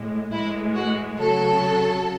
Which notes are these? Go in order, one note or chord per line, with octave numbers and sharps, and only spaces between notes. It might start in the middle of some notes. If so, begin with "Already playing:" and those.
Already playing: A2 G#3
A2 E3 G#3 E4
F#4
C#3 F#3 A4